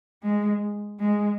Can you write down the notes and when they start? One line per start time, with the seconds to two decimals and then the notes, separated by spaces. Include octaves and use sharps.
0.23 G#3
1.00 G#3